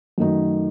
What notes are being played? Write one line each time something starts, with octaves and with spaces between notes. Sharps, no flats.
F#2 D#3 A3 D#4 F#4